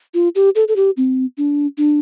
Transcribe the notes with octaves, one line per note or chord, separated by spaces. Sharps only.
F4
G4
A4
A4
G4
C4
D4
D4